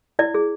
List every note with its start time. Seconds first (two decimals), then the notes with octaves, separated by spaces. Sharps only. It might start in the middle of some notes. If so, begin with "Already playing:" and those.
0.19 E4 D5
0.34 G#4